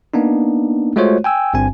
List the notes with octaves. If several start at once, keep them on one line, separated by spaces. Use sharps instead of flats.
A#3 B3 D4 D#4
G#3 A3 F4 F#4 C5 C#5
G5 G#5 E6
G1 G2 C4 G#5